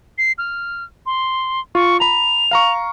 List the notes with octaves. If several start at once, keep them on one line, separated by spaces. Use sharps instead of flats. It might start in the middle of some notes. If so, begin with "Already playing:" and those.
C7
F6
C6
F4 C#6
A#5 B5 F7
F5 A#5 C#6